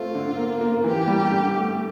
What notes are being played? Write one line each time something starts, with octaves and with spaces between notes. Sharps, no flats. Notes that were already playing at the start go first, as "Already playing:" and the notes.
Already playing: A3 C4 F4
D3
A#3
A#3
E3 G4
G3
D3
A3